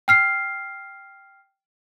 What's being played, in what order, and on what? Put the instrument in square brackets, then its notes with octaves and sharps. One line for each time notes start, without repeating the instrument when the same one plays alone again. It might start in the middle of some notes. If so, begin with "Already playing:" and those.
[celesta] G5 F6 C7